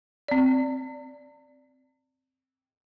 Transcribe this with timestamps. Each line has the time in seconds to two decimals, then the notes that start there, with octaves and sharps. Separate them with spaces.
0.28 C4 D5